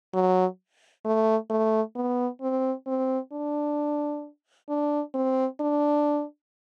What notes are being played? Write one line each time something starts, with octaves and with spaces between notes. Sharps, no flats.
F#3
A3
A3
B3
C4
C4
D4
D4
C4
D4